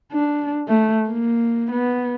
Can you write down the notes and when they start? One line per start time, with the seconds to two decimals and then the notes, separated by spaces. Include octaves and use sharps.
0.12 D4
0.68 A3
1.09 A#3
1.72 B3